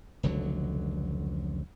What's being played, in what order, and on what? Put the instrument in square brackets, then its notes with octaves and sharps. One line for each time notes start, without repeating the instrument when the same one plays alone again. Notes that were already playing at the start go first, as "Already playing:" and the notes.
[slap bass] F1 C#2 D3 F#3